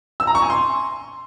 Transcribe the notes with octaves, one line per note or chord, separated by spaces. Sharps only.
E6
A#5
C#6
G#5
C6